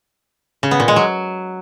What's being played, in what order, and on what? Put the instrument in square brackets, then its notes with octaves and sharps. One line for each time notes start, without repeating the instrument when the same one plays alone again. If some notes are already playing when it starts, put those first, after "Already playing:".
[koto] C#3
B3
A#2
G#3
F#3